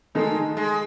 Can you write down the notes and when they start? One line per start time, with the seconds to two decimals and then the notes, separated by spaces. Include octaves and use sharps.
0.15 D#3 G#3 A3 D#4 A4
0.57 G#3